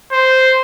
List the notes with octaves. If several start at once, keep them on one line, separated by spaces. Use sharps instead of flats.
C5